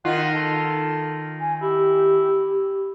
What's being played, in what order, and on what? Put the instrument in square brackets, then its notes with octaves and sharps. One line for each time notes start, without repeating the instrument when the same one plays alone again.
[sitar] D#3 F4 [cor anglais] F#5
[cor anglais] A4
[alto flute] G#5
[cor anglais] E4 [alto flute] G4